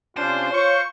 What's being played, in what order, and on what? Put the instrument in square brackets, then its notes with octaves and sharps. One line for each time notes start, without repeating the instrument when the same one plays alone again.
[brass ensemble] C3 C#4 F4 [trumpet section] D4 [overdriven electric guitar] C5
[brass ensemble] F4 [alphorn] C#5 [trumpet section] C#6